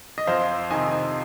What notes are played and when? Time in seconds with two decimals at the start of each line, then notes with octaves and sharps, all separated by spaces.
0.18 D#5
0.27 F2 C5 F5
0.70 C3 D#3 D#5 G#5